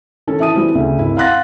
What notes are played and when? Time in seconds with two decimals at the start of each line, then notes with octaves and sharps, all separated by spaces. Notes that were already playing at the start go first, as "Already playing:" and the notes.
0.27 D#3 C#4 A4
0.40 E3 E5 A5 D#6 D#7
0.55 E3 G3 C4
0.75 D2 C#3
0.99 G#1 E4
1.17 F5 F#5 C6 F#6 A6 A#6